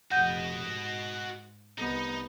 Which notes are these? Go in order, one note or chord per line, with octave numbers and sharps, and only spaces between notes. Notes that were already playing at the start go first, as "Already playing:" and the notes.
F1 F#4 D#5 F#5 G6
G#2
C2 B3 D#4